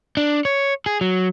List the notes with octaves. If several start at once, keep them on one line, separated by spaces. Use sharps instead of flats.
D4
C#5
G#4
F#3